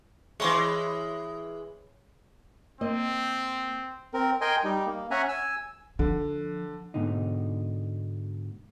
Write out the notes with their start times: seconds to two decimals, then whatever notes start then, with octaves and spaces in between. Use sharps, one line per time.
0.40 E3 G#3 C#5 C6 D6
2.81 A#3 C4 D#5
4.14 C4 A#4
4.41 A#4 D#5 G5 G#5 C6
4.64 G3 D#4
4.86 A#3
5.11 C#4 E5 F#5 G#5 A#5
5.28 G#5 E6
5.99 D3 F3
6.94 G#2 B2 D3 D#4